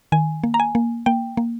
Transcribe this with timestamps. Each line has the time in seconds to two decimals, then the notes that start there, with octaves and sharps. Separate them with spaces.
0.12 D#3 G#5
0.44 A#3
0.54 A#5
0.60 G#5
0.75 A#3
1.06 A#3 G5
1.37 A#3